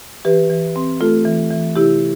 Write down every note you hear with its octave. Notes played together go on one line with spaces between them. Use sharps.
E3 G4 B4
E3
C4
A3 F4 A4
E3
E3
C3 E4 G4